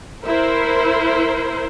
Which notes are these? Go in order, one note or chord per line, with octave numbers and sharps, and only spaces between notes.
E4 A#4 C5